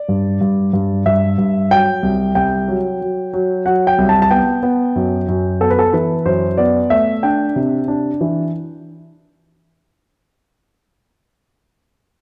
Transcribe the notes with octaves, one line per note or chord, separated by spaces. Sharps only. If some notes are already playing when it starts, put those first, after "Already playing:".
Already playing: D5
G2
G2
G2
G2 E5
G2
F#3 G5
C2
C2 G5
F#3
F#3
F#3
F#3 F#5
G5
C2
A5
A5
B3 G5
B3
F#2
F#2
B3 A4
B4
A4
E3 B4
F#2 C5
B3 D5
A3 E5
D4 G5
C3
D4
E3